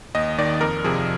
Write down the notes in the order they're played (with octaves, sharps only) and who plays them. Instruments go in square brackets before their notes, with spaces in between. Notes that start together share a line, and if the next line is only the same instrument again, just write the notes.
[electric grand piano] D#2 D#5
D#3 D5
F2 A#4
C3 F3 G#4